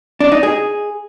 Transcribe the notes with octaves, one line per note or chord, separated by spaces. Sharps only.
D4
D#4
G#4